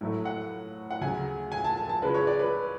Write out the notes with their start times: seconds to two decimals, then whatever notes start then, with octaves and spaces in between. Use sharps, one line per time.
0.01 A2 F#3 A3
0.25 F#5
0.90 F#5
1.01 D2 C#3 F#3 G#5
1.52 G#5
1.64 A5
1.77 A5
1.89 A5
2.02 C#2 C#3 G#3 B4
2.14 C#5
2.27 D5
2.39 B4